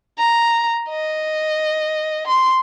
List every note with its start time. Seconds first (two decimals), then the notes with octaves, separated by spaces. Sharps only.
0.19 A#5
0.89 D#5
2.27 C6